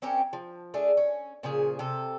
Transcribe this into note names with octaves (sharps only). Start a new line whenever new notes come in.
C4 C#4 G4 A#4
F3
A3 D4 G#4
C#4
A#2 C#3 F3 G#4
C3 A4